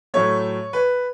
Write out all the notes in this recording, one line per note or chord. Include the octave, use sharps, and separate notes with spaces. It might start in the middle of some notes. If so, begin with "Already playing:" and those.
A2 F#3 A3 C#5
B4